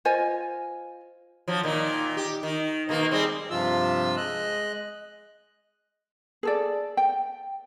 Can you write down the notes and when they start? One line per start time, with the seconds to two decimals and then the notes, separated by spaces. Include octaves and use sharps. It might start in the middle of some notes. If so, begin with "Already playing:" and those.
0.05 F4 C5 D#5 G#5
1.48 F3 F#3
1.63 A#2 D#3
2.17 G4
2.43 D#3
2.89 B2 D#3 A#3
3.11 G3 G#3 C4
3.50 G2 C3 F3 F4 E6
4.17 G#3 D#5 F#6
6.43 G#4 A4 D5
6.97 G5